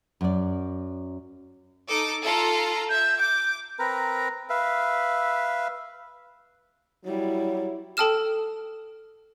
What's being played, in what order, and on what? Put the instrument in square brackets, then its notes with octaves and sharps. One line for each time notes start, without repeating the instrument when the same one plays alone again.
[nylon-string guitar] F#2 D5
[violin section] D#4 A4 D6
F4 A4 A#5
[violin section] E5 [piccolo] G6
[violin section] D6 [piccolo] G6
[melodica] C4 A#4 B4 A#5
B4 E5 F5
[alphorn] F#3 [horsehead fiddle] G3 E4
[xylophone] A4 G5 A5 D#6 F6 E7